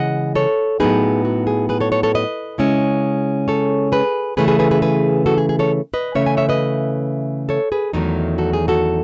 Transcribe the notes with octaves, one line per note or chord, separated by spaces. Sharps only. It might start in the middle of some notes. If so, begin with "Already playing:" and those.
Already playing: C#3 E3 G#3 D#5 F#5
A4 C#5
A2 F#3 B3 D#4 G#4 B4
F#4
G#4
G#4 B4
A4 C#5
A4 C#5
A4 C#5
B4 D#5
C#3 G#3 C#4 E4
A4 C#5
G#4 B4
C#3 E3 A3 C#4 G#4 B4
G#4 B4
G#4 B4
G#4 B4
G#4 B4
F#4 A4
G#4
G#4
A4 C#5
B4 D#5
C#3 E3 A3 C#4 C#5 E5
E5 G#5
C#5 E5
B4 D#5
A4 C#5
G#4 B4
E2 D#3 F#3 A3 D#4
F#4 A4
G#4
F#4 A4